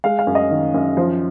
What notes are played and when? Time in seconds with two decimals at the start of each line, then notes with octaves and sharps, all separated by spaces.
0.04 G#3 F5
0.19 F5
0.27 F#2
0.35 D#5
0.51 D#3
0.74 F#2
0.97 F3 C5